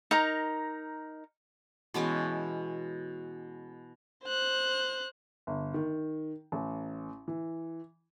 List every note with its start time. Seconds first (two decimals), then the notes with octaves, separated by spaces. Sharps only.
0.11 D#4 A#4 A#5
1.94 B2 E3 G#3 C#4
4.23 C5 F#6
5.47 G1
5.74 D#3
6.52 A1
7.28 E3